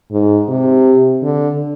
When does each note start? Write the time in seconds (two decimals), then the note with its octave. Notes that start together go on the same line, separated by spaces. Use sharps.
0.12 G#2
0.49 C3
1.23 D3